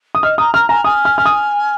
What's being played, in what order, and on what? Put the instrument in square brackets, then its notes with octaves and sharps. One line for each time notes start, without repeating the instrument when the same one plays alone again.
[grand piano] D#6
[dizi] D#5 [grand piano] F6
[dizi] A#5 [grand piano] D#6
[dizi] A#5 [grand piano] F6
[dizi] G#5 [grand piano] A#5
[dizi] G#5 [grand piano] D#6
[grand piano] F6
F6
D#6